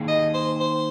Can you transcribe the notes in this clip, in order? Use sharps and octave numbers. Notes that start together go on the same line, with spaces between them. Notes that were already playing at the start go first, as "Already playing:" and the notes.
Already playing: D#3 A#3 D#4 G#4
D#5
C5
C5